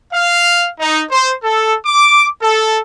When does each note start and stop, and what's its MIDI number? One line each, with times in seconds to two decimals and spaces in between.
0.13 0.69 77
0.80 1.03 63
1.11 1.32 72
1.44 1.75 69
1.86 2.27 86
2.42 2.79 69